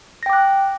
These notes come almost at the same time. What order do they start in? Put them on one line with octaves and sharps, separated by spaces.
A#6 G5 D6 F#6